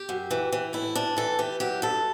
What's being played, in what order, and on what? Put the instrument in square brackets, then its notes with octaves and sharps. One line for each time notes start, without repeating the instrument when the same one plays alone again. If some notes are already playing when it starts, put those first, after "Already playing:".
Already playing: [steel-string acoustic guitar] G4
F#2
E3
E3
A2 E4
A2 D4
E3 A4
E3 G4
F#3 G4
G2 A4